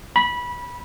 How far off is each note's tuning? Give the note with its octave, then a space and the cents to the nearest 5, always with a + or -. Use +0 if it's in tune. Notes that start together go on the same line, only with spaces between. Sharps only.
B5 -20